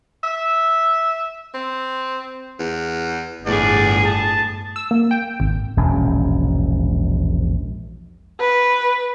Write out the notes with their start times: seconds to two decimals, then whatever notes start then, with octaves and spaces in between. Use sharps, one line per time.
0.24 E5
1.54 C4
2.59 E2
3.46 G1 E2 A2 G#4 D5
4.05 A5
4.76 E6
4.91 A#3
5.11 G5
5.40 G#1
5.77 E1 A#1 G#2 C#4
8.40 B4